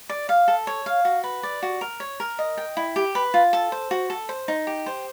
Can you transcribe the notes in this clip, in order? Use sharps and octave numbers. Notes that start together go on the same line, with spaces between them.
D5
F5
A4
C#5
F5
F#4
B4
D5
F#4
A#4
C#5
A#4
D#5
G5
E4
G4
B4
F4
A4
C5
F#4
A4
C5
D#4
G4
C5